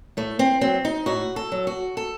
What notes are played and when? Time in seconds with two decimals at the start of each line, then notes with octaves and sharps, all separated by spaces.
0.17 A2 A3
0.39 C4
0.61 F#3 C4
0.85 D#4
1.06 A2 F#4
1.36 A4
1.52 F#3
1.67 F#4
1.97 A4